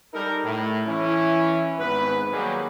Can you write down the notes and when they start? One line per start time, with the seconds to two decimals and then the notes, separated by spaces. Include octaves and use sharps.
0.14 G3 D#4 A4 A#4
0.44 A2
0.87 E3 C#4 E4
1.78 G#1 G#2 B3 B4
2.32 D#3 F#3 G3 A#3 D#4 G#4